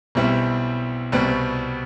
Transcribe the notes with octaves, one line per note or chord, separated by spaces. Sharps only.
B1 B2 G3 C4 E4
C2 B2 G3 C4